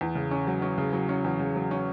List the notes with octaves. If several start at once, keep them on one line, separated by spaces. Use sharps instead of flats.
E2
C#3
C#4
F#3
C#4
C#3
F#3
C#4
E2
C#3
F#3
C#4